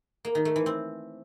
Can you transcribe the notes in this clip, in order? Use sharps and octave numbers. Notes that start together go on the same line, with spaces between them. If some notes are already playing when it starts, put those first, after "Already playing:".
A#3
D#3
A3
E3
C4